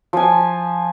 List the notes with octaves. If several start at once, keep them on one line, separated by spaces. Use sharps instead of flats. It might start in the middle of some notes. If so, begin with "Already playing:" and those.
F3 G#5